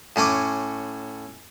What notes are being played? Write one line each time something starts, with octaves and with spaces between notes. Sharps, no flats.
A2 C#4 C#5 G#5 D6